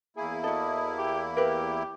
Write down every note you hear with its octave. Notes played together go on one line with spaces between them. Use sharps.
E2 A#3 E4 G#4
F#4 A4 D#5
G4
G4 A#4 B4